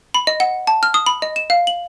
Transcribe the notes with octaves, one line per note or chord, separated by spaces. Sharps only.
B5
D#5
F#5
A5
F6
D#6
B5
D#5
E7
F5
F#7